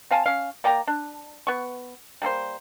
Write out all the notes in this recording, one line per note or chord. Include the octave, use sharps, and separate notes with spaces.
C4 F5 G#5 A5
C#4 F5
A#3 D5 G5 A#5
D4
B3 C#6
G3 A#3 A4 C5